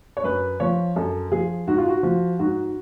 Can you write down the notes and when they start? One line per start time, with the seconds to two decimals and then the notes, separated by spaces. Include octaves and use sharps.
0.17 C#5
0.24 F#2 B4
0.60 F3 C#5
0.96 F#2 A4
1.31 F3 G#4
1.67 G#2 F#4
1.78 F4
1.88 F#4
2.03 F3
2.39 G#2 F#4